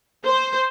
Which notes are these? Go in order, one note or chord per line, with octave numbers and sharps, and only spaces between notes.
C5